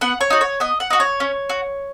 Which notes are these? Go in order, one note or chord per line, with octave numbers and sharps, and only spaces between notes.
B3 F#5
C#5
D#4 F#4
C#5
B3 D#5
F#5
D#4 F#4
C#5
C#4
F#4